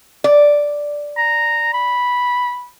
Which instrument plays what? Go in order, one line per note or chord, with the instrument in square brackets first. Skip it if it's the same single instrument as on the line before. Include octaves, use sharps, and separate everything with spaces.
[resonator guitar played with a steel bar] D5
[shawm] A#5
B5